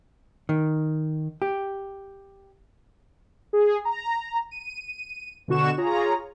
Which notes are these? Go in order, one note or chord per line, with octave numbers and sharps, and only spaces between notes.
D#3
G4
G#4
A#5
D#7
B2 D3 F#4 C#6 E7
F4 G#4 C#5 A#5